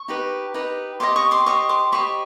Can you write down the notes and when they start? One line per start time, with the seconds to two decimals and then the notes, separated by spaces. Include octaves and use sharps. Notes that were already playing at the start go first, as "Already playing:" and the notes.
Already playing: C#6
0.08 D#4 G4 B4
0.54 D#4 G4 B4
1.00 G4 C5 D#5 C6 D6
1.16 C#6 D#6
1.31 C6 D6
1.46 G4 C5 D#5 C#6 D#6
1.69 C6 D6
1.92 G4 C5 D#5 B5 C#6